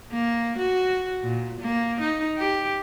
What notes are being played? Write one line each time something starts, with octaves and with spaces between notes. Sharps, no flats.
A#3
F#4
A#2
A#3
D#4
G4